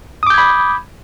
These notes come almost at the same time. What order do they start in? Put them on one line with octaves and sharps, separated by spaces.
D#6 D6 G6 G#6 B5